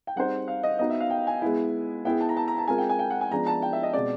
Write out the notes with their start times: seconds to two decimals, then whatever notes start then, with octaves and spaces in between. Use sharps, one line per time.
0.07 G5
0.16 G3 C4 D#4 G#4 C5 F#5
0.48 F5
0.63 D#5
0.79 B3 D#4 F#4 D#5
0.90 E5
1.00 F5
1.10 G5
1.27 G#5
1.42 G#3 B3 E4
2.05 B3 E4 G#4 G5
2.21 A5
2.29 A#5
2.37 A5
2.48 A#5
2.58 A5
2.68 G#3 C4 F4 A#4 G#5
2.78 G5
2.89 G#5
2.99 G5
3.10 F#5
3.21 G#5
3.31 F3 G#3 B3 D4 A#5
3.47 A5
3.62 G5
3.73 E5
3.83 D#5
3.93 B2 G#3 C4 D5